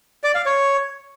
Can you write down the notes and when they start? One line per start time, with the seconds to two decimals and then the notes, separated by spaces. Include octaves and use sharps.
0.24 D5
0.35 F5
0.46 C#5